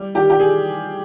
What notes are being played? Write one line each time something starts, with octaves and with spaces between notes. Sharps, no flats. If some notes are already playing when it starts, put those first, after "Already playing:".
Already playing: G3
D#3 G4
G4
G#4